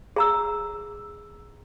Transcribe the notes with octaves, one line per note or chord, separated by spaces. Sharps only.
G#4 A#5 E6